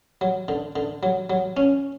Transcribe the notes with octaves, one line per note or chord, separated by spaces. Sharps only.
F#3
D3
D3
F#3
F#3
C#4